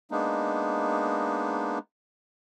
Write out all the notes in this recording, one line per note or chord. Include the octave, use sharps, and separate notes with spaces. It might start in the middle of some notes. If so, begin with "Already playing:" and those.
G#3 A#3 B3 D4 D#4